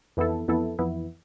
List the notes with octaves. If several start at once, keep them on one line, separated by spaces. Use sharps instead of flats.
F2 E3 B3 E4 A4
F2 E3 B3 E4 A4
F2 E3 B3 E4